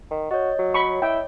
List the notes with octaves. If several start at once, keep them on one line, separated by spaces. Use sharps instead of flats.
D#3
F#4 C#5 D#5
F#3
B5 C#6
E4 G5